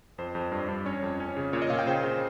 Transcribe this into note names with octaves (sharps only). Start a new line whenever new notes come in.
F2 C5
F2
G2
G2
C#4 C#5
F2
C#4
C#3
A#2 C#5
D#5
A#2 F5
G5
C#3 C5
C#3